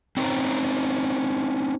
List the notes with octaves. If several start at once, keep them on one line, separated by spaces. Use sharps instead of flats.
C4 C#4 D#4 C5 A#5